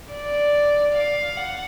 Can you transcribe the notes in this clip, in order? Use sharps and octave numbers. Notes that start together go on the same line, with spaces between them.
D5
F5
F#5